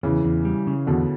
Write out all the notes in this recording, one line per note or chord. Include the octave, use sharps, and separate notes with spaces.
E2 C#3 E3
E2
G3
C#3
E2 B2 D3